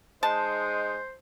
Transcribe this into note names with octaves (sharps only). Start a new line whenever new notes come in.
G#3 D#4 C5 A5